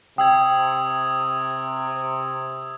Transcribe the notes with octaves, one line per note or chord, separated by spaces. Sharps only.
C3 G5 D#6 E6 G#6